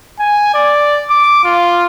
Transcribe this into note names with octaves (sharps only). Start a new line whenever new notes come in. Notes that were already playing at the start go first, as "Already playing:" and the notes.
G#5
D5
D6
F4